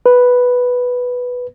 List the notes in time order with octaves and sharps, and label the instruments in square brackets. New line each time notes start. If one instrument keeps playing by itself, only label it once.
[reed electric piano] B4